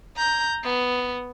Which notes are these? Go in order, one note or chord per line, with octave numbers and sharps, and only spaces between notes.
A#5 G6
B3